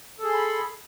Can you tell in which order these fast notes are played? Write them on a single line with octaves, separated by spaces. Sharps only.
A4 G#4 C6 B5